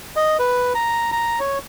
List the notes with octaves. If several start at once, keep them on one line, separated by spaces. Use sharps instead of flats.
D#5
B4
A#5
A#5
C#5